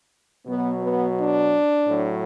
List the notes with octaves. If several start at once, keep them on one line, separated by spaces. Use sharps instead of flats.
B2 F#3 B3
B3
D4
A2 F#3